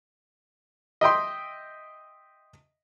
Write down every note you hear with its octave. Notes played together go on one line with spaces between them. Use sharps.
D#5 E5 G5 C6